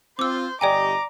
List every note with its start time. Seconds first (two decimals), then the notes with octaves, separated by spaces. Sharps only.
0.19 C4 F4 C5 D6 E6
0.61 G1 G4 D5 D#5 G5 G#5 A#5 D6